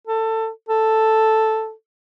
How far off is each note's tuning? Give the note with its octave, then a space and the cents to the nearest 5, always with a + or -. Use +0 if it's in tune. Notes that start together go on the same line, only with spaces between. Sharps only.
A4 +20
A4 +0